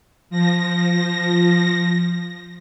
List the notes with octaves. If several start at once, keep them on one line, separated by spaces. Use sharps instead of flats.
F3 A#6